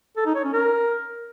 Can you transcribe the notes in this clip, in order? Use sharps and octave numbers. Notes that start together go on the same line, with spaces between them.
A4
D#4
C#5
C#4
A#4